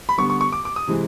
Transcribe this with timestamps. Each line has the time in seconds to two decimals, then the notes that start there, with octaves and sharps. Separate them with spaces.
0.09 B5
0.18 D3 G3 B3 C#6
0.30 C#6
0.41 C#6
0.52 D6
0.65 D6
0.76 D#6
0.87 C3 E3 G#3 C4